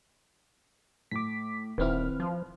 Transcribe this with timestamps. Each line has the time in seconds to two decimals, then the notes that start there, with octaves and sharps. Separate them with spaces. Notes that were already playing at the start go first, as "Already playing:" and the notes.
1.11 A2 D6 B6
1.78 D#1 D#3 C4 E4 B4 F6
2.20 F3